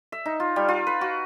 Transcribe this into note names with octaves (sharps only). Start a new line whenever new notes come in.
E5
D#4
F4
G3
F4
B4
F#4